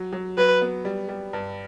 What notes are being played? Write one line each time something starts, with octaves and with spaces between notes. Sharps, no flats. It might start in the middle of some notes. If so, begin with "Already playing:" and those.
Already playing: F#3
F#3
F#3 B4
B3
G3
G3
G2